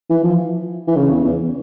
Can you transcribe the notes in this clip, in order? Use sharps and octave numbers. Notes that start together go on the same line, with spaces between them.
E3
F3
E3
C#3
E2
E2